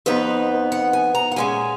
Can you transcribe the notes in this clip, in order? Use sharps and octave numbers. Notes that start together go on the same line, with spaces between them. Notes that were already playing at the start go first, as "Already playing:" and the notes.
F2 F3 B3 D#4 B4
F#5
G#5
A#5
F#5
A#2 G#3 C#4 G#5